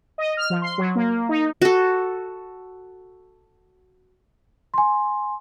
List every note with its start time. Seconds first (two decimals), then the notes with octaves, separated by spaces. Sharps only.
0.18 D#5
0.37 F6
0.50 F3
0.62 C6
0.78 F#3
0.95 A#3
1.29 D#4
1.62 F#4 A4
4.74 G#5 C6